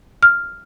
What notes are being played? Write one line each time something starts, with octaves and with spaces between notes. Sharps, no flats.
F6